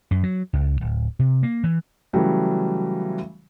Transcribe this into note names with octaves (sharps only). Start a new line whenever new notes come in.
F#2
F#3
C#2
D1
C3
A#3
E3
C#3 E3 F#3 G3 A3